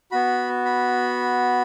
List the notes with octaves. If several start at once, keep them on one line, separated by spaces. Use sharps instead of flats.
B3 F#4 B5
B5